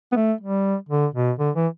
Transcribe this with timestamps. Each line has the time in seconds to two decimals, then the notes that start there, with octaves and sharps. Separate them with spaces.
0.12 B3
0.16 A3
0.41 G3
0.89 D3
1.14 B2
1.39 D3
1.56 E3